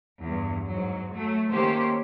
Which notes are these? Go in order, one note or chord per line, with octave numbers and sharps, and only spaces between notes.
E2 G2
G#2 F#3
F#3 A3
D#3 A3 A#3 C#4 G4 C5